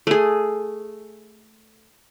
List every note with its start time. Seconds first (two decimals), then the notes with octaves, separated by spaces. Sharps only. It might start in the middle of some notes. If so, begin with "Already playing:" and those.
0.07 A3 G#4